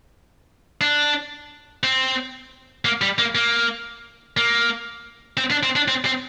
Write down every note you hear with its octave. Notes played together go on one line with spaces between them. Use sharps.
D4
C4
A#3
G3
A#3
A#3
A#3
C4
D4
C4
D4
C4
C4